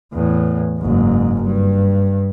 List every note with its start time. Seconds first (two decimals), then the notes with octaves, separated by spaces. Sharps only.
0.13 E2 A2
0.79 F#1 G#2
1.43 G2